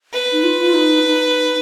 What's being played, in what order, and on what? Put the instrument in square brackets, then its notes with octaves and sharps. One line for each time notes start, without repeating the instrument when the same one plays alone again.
[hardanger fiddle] B4
[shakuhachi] D#4
F4
F4
D#4
D#4